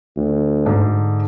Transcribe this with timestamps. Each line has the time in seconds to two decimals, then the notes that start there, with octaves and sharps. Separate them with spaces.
0.17 D2
0.66 G#2 D3 D4